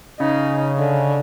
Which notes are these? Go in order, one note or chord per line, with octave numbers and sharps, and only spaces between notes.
C#3 D#4
D3